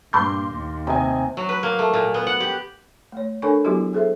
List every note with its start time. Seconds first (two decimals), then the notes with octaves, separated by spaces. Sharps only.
0.13 G2 A#2 C6 D6 G6
0.52 D#2
0.87 C3 D#5 G#5
1.37 F#3
1.49 B4
1.63 A#3
1.79 A3
1.94 A#2
2.14 B3
2.27 F#5
2.41 G4
3.12 A3 C#5
3.42 D4 A4 A#4 C#5 G#5 C#6
3.65 F#3 B3 E4 F#4 G4
3.93 G#4 A4 C5 E5